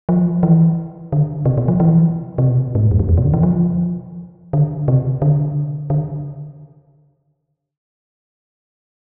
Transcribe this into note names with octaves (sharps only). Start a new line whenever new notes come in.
F3
E3
D3
C3
B2
F3
E3
C3
B2
G#2
A2
F2
E2
F2
B2
D3
E3
F3
D3
C3
D3
D3